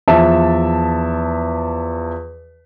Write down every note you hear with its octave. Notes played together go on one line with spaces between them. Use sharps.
E2 F3 E5 A5